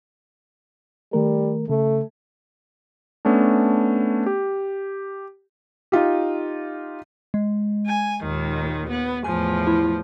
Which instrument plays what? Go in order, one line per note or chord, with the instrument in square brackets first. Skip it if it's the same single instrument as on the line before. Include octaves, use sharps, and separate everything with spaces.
[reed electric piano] D#3 A3 A#4 [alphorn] G3
[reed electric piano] C#3 [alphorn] A3
[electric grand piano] A3 B3 C#4 D4
G4
[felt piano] D#4 F4 G4
[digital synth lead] G#3
[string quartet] G#5
D#2 A#2 D#3
B3
[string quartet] E2 A2 F3 [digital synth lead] G#5
[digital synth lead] E4